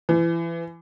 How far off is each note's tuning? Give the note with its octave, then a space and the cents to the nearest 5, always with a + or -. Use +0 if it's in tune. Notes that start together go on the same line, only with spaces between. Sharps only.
E3 +25